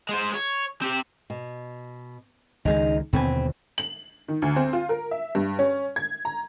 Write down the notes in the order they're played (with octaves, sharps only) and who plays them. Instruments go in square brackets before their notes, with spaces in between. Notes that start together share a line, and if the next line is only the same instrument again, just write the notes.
[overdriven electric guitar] G#3 C5
C#5
C4 G4
[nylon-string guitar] B2
[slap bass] C#2 D#3 G#3 [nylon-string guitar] D#4 G#4
[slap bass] D#2 B2 D3 [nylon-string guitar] C4 B4 G#5
[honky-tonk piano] F#7
D#3
D2
C4
F4
A#4
E5
G2
C#4
G#6
A#5